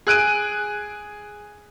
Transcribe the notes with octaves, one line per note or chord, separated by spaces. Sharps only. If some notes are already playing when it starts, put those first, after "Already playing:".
G#4 F#6 D7 D#7